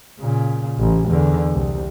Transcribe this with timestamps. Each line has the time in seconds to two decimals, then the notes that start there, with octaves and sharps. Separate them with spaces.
0.20 A#2 C#3
0.80 A1
1.10 E2 D3
1.53 C2